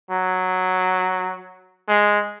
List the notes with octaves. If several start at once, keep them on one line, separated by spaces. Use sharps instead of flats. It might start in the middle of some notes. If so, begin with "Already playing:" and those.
F#3
G#3